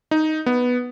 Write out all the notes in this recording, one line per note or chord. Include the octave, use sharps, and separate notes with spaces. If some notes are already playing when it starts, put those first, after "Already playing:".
D#4
B3